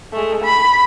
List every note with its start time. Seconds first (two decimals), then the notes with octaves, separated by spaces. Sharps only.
0.13 G#3 A3
0.44 B5